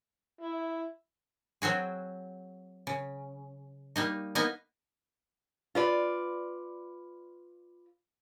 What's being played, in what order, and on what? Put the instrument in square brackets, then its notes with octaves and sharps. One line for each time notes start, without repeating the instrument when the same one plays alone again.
[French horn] E4
[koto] F#3 C4 F#4 G#4
C#3
G3 A#3 D#4
A#3 B3 D#4 D#5 G#5
[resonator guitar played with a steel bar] F4 B4 D5